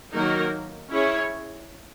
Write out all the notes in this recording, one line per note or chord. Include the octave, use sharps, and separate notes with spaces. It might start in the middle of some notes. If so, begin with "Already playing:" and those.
D#3 F#3 A#3 D#4 A#4
C#4 E4 G#4 C#5